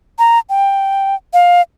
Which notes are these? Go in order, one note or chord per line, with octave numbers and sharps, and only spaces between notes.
A#5
G5
F5